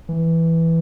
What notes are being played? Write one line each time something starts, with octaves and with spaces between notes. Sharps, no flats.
E3